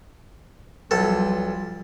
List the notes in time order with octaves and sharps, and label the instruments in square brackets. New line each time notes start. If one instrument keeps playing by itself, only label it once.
[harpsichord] B1 A4 [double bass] F3 G3